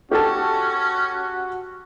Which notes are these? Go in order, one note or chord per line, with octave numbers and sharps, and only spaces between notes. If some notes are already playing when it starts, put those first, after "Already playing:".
C#4 F#4 G4 A4 A5